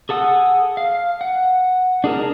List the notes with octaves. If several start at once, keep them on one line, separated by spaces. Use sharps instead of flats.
G#4 A4 F#5 D#6
F5
F#5
D4 G#4 A#4 A5